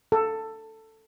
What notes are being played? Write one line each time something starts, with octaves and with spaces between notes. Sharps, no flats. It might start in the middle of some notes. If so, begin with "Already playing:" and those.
A4